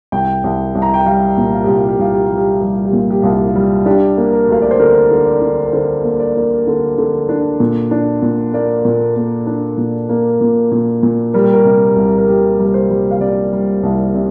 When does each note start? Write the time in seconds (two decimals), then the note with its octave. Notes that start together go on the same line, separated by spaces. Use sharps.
0.12 C2 G5
0.44 C2
0.75 C2
0.82 A#5
0.94 G5
1.06 G3 F5
1.38 A#2
1.52 F4
1.64 C2 G4
1.77 F4
1.89 G4
1.99 C2 F4
2.13 G4
2.26 G3 F4
2.38 G4
2.49 F4
2.61 G3 G4
2.74 F4
2.85 G4
2.93 A#2
2.98 F4
3.10 G4
3.22 C2 F4
3.34 G4
3.47 F4
3.55 G3
3.86 D4 G4
4.17 A#3
4.33 A#4
4.49 D2 F5
4.62 D5
4.71 C5
4.79 D3 A#4
5.11 D3
5.26 D5
5.42 D3
5.67 A#4
5.73 D3 C5
6.04 A#3
6.20 D5
6.36 A#3
6.67 D3
6.98 D3
7.29 D4
7.60 A#2
7.91 D4
8.22 A#2
8.53 A#3 D5
8.85 A#2
9.16 A#3
9.47 D4
9.78 A#2
10.09 A#3
10.41 A#2
10.72 A#2
11.03 A#2
11.34 G3 A#4
11.43 G4
11.54 A#4
11.65 C3
11.96 C2
12.18 A#4
12.28 C3 G4
12.59 G3
12.65 A#4
12.74 C5
12.90 G3
13.11 F5
13.21 C3 D5
13.52 G3
13.83 C2
14.15 C3